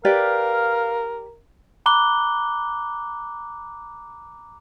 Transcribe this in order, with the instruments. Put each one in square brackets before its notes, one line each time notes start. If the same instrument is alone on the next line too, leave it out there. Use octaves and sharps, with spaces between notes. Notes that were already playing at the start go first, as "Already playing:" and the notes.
[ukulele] G4 B4 D5 [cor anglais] A#4 [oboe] F5
[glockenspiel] A#5 B5 D6 F#6 G7